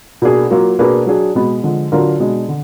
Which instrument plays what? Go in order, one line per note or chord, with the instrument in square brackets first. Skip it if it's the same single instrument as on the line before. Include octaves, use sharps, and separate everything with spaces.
[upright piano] B2 A#3 D4 G#4
F#3 A#3 F4
B2 A#3 D4 G#4 B4
F#3 D4 G#4
B2 G#3 B3
D3 F3 G#3
D3 F#3 D4 F4 A#4
B2 G#3 B3 D4
D3